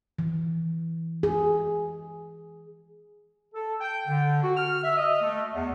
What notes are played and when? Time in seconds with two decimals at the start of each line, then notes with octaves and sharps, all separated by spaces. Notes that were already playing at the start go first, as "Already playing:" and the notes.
0.19 E3
1.23 G#4
3.54 A4
3.80 G5
4.07 D3
4.42 F#4
4.57 F6
4.84 E5
4.97 D#5
5.22 A3
5.54 E2